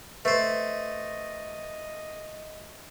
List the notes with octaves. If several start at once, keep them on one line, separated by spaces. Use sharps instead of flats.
A3 B4 C5 D#5